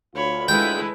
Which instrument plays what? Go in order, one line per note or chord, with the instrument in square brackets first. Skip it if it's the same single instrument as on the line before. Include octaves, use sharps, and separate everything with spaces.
[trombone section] D2 F4 [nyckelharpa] C#5 B5
[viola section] G#3 A4 B4 [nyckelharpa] E4 [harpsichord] G5